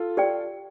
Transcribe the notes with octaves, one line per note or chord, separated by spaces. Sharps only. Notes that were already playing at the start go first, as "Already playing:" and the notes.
Already playing: F4 A4
G4 D5 G5